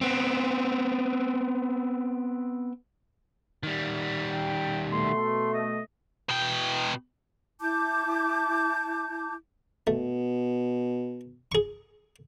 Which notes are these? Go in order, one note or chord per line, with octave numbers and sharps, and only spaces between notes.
B3 C4
D#3 G3
G5
B2 A3 C6
D#5
B2 G5
E4 A5 D6 G6
B2 A3
G#4 C#6